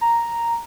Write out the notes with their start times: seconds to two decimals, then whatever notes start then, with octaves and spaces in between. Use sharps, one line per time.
0.01 A#5